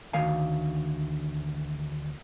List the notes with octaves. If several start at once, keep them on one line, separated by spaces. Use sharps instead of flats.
D2 D#3 F5 G#5